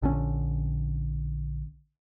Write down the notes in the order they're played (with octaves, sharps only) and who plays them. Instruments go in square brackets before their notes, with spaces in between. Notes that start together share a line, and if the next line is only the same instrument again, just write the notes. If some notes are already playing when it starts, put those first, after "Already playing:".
[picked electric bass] A#1 D3 D#3 C#4